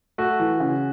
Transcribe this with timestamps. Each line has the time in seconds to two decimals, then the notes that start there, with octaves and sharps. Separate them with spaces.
0.18 A3 F#4
0.39 E3
0.60 C#3